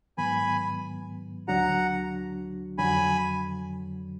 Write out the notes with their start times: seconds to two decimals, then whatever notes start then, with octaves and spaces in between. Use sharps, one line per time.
0.18 G#2 D#3 F#3 B3 G#5 B5
1.48 D2 D3 F#3 D4 F#4 F#5 A#5
2.78 F2 D3 F#3 G#5 B5